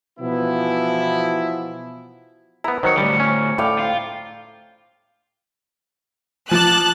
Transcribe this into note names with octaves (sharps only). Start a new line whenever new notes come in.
B2 E3 F3 B3 E4
B3 E4 A#5
D#3 F#3 C5 C#7
A2 D3 G3
C#4
A2 D5 F5 G5
F4
F3 A5 D6 F#6